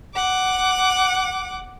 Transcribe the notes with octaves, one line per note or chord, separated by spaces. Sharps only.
F#5 D6